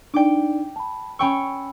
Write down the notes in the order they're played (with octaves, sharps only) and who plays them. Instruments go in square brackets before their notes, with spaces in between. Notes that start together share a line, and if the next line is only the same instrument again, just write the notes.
[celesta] D4 D#4 D5 [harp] G5 D6
[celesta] A5 B5
[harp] C#4 G5 C#6 [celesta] B5 E6